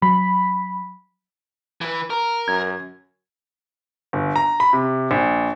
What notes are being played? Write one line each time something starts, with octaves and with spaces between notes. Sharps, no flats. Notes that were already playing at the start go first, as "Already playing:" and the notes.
F#3 B5
E3 B4
A#4
F#2 G#6
G1
A#5
B5
C3
A#1